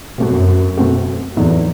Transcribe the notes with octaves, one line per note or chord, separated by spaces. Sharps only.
F#2 B2 A3 C4 F#4
B2 A3 C4 F#4
E2 A2 F#3 B3 D#4